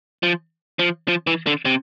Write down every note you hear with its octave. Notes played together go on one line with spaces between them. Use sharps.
F3
F3
F3
E3
D3
C3